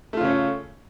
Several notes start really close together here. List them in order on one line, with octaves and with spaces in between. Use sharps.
A3 F4 C#3 C#4